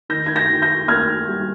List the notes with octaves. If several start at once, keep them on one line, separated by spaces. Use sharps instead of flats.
D#3 G6 A#6
G#6
G6 A#6
D#3
G6 A#6
A#3 F6 G#6
G3